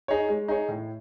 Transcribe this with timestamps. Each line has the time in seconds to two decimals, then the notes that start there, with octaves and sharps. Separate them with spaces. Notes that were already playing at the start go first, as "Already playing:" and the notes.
0.08 D#4 G#4 C#5
0.29 G#3
0.48 D#4 G#4 C#5
0.68 A2